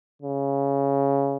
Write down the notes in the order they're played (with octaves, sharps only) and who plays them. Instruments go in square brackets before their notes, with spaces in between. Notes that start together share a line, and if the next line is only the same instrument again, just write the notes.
[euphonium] C#3